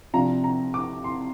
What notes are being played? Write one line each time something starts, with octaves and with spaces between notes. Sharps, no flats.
C3 F3 D4 F4 A#5
A#5
D6
C6